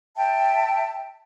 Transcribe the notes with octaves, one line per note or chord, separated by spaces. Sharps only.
E5 G5 A5